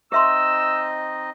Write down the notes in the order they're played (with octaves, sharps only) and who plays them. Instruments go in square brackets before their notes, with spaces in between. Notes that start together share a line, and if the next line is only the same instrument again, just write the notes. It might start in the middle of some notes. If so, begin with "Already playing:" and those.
[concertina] C4 D#4 D#5 [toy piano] G4 E5 C6 [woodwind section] E6